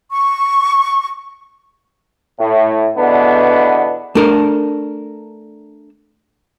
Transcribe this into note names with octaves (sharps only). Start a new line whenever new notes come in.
C#6
A2
E2 B2 D3 B3 D4
A3 D4 A4 A#4